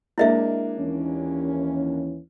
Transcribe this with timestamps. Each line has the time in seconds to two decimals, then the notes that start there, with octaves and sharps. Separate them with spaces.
0.18 G#3 A#3 D4 E4 D#5 E5
0.79 D#2 E3 C#4